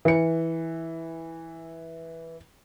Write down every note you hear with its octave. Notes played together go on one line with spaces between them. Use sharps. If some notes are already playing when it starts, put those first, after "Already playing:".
E3 C#7